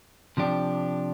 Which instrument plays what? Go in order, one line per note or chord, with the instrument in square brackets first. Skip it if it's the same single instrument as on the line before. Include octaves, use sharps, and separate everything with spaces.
[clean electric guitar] C3 F3 D4 G4